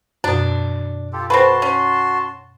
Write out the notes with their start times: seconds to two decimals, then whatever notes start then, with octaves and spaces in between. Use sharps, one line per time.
0.24 F#2 B2 D4
1.13 F4 G4 A4
1.30 C4 F#4 A4 B4 A5 C6
1.62 C#4